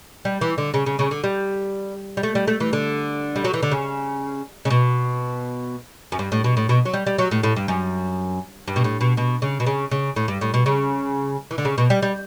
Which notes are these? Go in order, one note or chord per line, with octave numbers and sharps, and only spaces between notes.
G3
E3
D3
C#3
C#3
C#3
D3
G3
G3
A3
G3
A3
E3
D3
G3
F#3
E3
D3
C#3
C#3
B2
F#2
G2
A2
B2
A2
B2
F#3
G3
G3
F#3
A2
A2
G2
F#2
G2
B2
A2
B2
B2
C#3
B2
C#3
C#3
A2
G2
A2
B2
C#3
E3
D3
C#3
B2
G3
G3